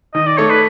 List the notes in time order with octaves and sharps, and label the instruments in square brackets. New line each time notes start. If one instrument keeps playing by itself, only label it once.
[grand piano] D#3 [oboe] D#5
[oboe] D5
[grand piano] A3 [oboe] C#5
[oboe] B4